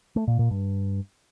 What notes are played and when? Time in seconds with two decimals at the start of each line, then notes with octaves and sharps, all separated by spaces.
0.16 A3
0.27 A#2
0.39 A#2
0.51 G2